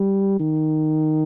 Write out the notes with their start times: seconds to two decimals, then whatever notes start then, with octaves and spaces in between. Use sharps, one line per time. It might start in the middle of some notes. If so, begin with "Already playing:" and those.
Already playing: G3
0.39 D#3